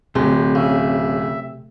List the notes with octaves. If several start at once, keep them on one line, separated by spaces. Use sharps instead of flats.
D1 C3 G#3
C#3 E5